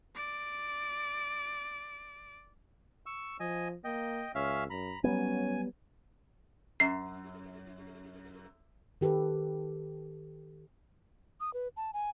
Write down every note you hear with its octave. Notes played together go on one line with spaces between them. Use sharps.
D5 D7
C#6 E6
F3 D#5 G#5
A#3 D#5 G5
C#2 C#4 E5 F5
F#2 A#5 B5
F#3 G3 B3 C#4 G#5
F#2 C7
D#3 G4 A4 B4
D#6
B4
A5
G#5